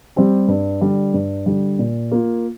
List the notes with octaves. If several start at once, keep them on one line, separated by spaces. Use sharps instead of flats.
G3 C4 G4
G2
D3 G3
G2
D3 G3
A#2
A#3 F4